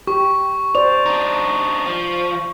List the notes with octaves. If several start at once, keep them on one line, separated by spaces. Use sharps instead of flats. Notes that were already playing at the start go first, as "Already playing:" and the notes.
G4 C#6
C5 D5 F7
D4 D#4
F3